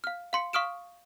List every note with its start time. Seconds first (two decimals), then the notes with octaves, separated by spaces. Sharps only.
0.04 F5 F6
0.33 F5 C6 C#7
0.53 F5 C#6 D#6 F6 D7 E7